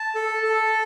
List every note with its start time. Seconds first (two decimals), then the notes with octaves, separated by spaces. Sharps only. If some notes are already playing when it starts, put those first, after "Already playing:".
Already playing: A5
0.15 A4
0.43 A4